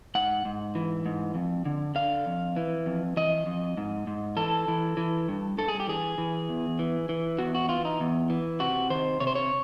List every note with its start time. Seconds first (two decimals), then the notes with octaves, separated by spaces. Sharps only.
0.15 G#2 F#5
0.45 G#2
0.75 E3
1.05 G#2
1.35 F2
1.65 D3
1.95 D3 F5
2.26 F2
2.56 E3
2.86 F2
3.17 E3 D#5
3.46 F2
3.77 G#2
4.07 G#2
4.37 E3 A4
4.68 E3
4.97 E3
5.28 G2
5.58 G2 A4
5.68 G#4
5.80 G4
5.88 E3 G#4
6.18 E3
6.49 E2
6.79 E3
7.09 E3
7.39 E2 F#4
7.55 F#4
7.69 E3 F4
7.85 D#4
8.00 E2
8.30 E3
8.60 C3 F#4
8.90 D#3 C5
9.20 C3 C#5
9.27 C5
9.35 C#5